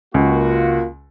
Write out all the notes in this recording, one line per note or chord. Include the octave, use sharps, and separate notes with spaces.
C#2 A#3 F4 F#4